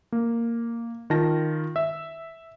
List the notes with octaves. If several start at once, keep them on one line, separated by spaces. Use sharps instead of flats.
A#3
D#3 F4 A5 A#6
E5 E6